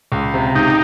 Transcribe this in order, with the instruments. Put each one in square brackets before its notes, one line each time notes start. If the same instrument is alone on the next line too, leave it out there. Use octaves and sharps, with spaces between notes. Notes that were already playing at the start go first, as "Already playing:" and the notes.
[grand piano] C#2
C3
[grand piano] C#2 [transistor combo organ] D#4 G4